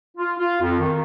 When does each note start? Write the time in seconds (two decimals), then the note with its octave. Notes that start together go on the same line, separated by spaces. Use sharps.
0.17 F4
0.39 F4
0.61 F2
0.79 D#3